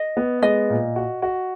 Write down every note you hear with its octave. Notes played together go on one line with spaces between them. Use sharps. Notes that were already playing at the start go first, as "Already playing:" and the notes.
Already playing: D#5
B3
G#3 D#5
A#2
F#4
F#4